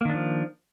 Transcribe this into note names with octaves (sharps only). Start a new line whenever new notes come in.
D#3 F3 A#3 D4